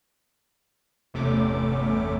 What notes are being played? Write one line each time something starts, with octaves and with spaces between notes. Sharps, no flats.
G1 E2 C3 A3 C#4 D6